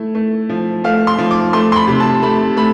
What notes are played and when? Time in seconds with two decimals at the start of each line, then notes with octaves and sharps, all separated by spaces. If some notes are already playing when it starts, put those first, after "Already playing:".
Already playing: A3 E4
0.15 A3
0.49 F3
0.84 A3 F5
1.07 C6
1.18 F3
1.31 D6
1.53 A3 C6
1.72 C6
1.76 B5
1.87 C3
2.00 A5
2.22 A3 B5
2.57 A3 B5